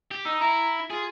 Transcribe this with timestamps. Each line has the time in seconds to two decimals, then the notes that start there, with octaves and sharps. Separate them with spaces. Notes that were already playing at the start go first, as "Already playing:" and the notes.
0.11 G4
0.26 D#4 E6
0.41 E4 A#5
0.90 F4 G#4